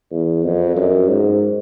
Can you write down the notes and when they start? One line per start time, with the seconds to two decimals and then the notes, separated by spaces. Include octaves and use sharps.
0.11 E2
0.44 F2
0.76 F#2
1.09 G#2